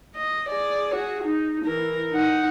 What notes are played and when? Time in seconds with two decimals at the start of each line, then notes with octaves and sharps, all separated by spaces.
0.15 D#5
0.48 G#4 D5
0.95 F#4 G#4
1.24 D#4
1.65 E3 A#4
2.11 D#4 F#5